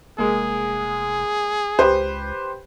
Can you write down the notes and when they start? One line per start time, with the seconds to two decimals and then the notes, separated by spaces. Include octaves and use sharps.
0.18 F1 G#3 A#3 G#4
1.79 C#2 G4 B4 C5